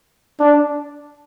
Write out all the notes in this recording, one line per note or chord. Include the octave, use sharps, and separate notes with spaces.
D4